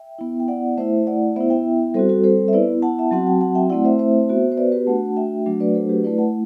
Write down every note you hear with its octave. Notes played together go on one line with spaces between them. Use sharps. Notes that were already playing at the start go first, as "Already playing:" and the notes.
Already playing: E5 G5
B3 E4
G5
D5 F#5
A3 E4 C5 E5
D5 F#5
B3 E4 C5 E5
E5 G5
G3 C4 F#4 A4 C5
F#4 A4
A4 C5
E5
B3 E4 B4 D5
F#5 A5
E5
F#3 C4 F#4 F#5
G5
F#5 A5
E5 G5
A3 C4 E4 D5 F#5
C5 E5
C5 E5
B3 F#4
C5
B4 D5
G4 B4
A3 D4 F#4 F#5 A5
E5 G5
F#3 A3 D4 F#4
B4 D5
A4 C5
G4 B4
A3 E4 B4 D5
F#5 A5